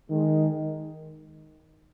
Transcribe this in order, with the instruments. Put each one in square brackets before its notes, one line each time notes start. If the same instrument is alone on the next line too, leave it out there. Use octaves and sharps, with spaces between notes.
[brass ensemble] D#3 G#3